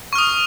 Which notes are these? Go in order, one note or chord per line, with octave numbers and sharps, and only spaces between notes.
C#6 D#6 F6